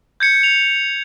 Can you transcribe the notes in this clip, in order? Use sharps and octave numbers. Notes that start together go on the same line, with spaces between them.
G6 G#6 C#7
F7